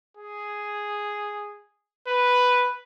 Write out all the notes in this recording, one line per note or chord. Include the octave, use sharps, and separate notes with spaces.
G#4
B4